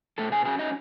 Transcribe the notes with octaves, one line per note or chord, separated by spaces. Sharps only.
B2 A3 A4
G#4 G#5
F#3 C#4 G#4 G#5
D#4 D#5